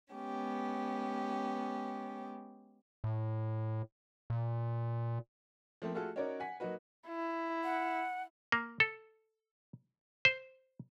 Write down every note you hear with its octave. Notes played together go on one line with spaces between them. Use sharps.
G#3 B3 C#4 G4
A2
A#2
F3 A3 A#3 C4
A3 F4 F#4 G#4 A4
C#4 D#4 F#4 A#4 C#5 D5
F#5 G#5 B6
F#3 A#3 D#4 F#4 B4
E4
F#5
A#3
A4
C5